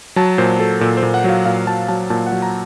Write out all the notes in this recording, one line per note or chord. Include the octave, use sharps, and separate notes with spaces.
F#3 A5
A#2 C5
F#3 A4
A#2 A4
C5
A#2
F#5
F#3 F5
A#2 F5
F#3 A5
F#3 A5
A#2 A5
F#5
F#3
A#5